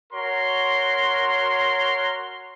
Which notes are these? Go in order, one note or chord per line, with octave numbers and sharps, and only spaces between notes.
F#4 A#4 C#5 C6